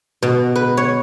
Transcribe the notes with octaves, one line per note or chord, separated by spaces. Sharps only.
B2
B4
C#5